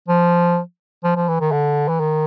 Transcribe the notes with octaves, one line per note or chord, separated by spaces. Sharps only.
F3
F3
F3
E3
D#3
D3
E3
D#3